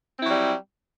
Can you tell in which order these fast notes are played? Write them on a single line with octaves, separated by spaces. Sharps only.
C4 E4 F#3 G3